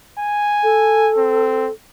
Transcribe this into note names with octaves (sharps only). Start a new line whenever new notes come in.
G#5
A4
C4